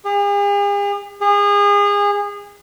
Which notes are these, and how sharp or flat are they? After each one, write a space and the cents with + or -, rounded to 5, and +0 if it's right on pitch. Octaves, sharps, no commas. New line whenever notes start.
G#4 -45
G#4 -30